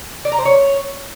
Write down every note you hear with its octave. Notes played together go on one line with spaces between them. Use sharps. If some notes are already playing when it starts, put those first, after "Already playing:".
D5
A#5
C5
C#5